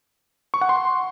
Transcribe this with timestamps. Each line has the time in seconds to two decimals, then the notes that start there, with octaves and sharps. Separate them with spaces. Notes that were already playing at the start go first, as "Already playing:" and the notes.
0.54 C#6
0.61 F#5
0.69 C6